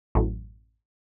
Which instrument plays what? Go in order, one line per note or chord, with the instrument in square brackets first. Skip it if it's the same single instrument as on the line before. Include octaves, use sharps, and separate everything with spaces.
[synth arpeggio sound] A1 F#2 A2